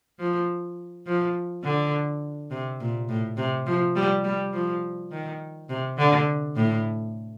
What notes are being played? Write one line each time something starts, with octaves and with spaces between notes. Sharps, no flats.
F3
F3
D3
C3
A#2
A2
C3
F3
G3
G3
F3
D#3
C3
D3
A2